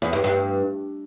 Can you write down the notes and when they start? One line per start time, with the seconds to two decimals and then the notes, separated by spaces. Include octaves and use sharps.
0.02 E2
0.13 G2
0.24 G2